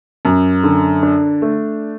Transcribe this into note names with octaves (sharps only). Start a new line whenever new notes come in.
F#2
D3
D4
A3